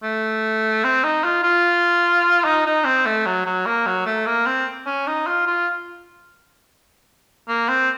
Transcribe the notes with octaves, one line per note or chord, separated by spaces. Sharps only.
A3
C4
D#4
F4
F4
D#4
D#4
C4
A3
F#3
F#3
A#3
F#3
A3
A#3
C4
C#4
D#4
F4
F4
A#3
C4